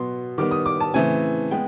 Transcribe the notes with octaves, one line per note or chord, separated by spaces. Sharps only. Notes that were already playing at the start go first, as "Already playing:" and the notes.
Already playing: B2 F#3 B3 C6
D#3 G3 B3 D6
D#6
D6
A5
C#3 E3 A3 C4 G#5
G#3 B3 G5